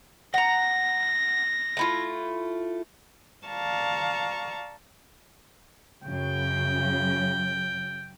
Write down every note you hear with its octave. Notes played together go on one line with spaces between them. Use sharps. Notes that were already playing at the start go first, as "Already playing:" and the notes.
F#5 A#5 A#6
A3 E4 F4
D5 F5 A5 A#5 C#6
F#2 C#3 G5